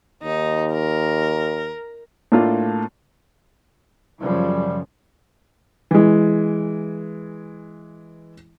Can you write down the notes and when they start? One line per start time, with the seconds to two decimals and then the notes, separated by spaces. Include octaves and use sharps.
0.23 D#2 D#4
0.73 A#4
2.32 A2 A3 A#3 D4 F4
4.21 F#2 C#3 F3 G3
5.91 E3 G#3